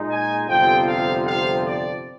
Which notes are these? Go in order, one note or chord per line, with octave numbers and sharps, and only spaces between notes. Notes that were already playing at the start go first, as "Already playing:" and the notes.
Already playing: A#2 G#3 D#4
G#5
G1 F2 C3 F3 C4 G5
F5
F5
D5